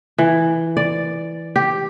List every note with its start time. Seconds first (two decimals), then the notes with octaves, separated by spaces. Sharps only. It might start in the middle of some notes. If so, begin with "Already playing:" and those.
0.18 E3
0.77 D5
1.56 G4